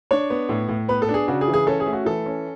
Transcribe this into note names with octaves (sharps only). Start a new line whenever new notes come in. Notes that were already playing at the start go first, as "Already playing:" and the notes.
D4 C#5
B3
A2
A2
B3 B4
A4
D4
G#4
C#3 F#4
G#4
E3
G#4
C#4 A4
G#4
A3
F#4
E3 A4
C#4